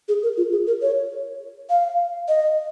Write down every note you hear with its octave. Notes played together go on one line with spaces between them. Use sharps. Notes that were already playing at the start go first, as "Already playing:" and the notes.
G#4
A#4
F4
G#4
A#4
C#5
F5
D#5